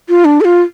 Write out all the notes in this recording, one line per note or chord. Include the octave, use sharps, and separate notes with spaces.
F4
D4
A4
F4